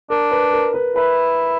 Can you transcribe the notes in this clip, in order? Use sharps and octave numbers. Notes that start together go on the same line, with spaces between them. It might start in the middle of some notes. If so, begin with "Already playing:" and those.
D4 A#4
B4
A#4
B4
E4 B4